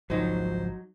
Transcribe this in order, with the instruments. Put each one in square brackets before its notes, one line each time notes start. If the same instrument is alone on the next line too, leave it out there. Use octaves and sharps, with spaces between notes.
[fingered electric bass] G#1 C#2 F3 [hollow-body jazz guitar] F#3 D#4 [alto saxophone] C5